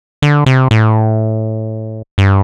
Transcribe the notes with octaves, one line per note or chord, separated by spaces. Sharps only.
D3
C3
A2
G2